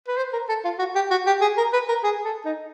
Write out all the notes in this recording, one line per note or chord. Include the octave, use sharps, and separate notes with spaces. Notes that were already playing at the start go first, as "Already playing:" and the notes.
B4
C5
A#4
A4
F4
F#4
G4
F#4
G4
G#4
A#4
B4
A#4
G#4
A4
D#4